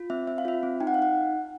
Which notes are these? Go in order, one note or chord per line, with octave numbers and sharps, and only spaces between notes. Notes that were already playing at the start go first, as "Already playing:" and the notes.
Already playing: F4
C4 E5
C4 E5
F5
F4 E5
C4
D#4 G5
F#5
F5
D#4 F#5